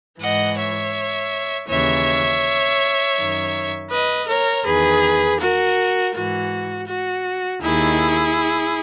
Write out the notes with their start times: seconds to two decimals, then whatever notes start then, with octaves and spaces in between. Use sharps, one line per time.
0.20 G#2 E3 D#5 F#5
0.57 C#5 E5
1.69 D#2 C#3 E3 C#5 E5
3.18 F#2 D#3
3.92 B4 D#5
4.28 A#4 C#5
4.66 E2 D#3 G#4 B4
5.40 F#4 A#4
6.14 G#2 E3 F#4
6.88 F#4
7.62 D#2 D#3 E4 G#4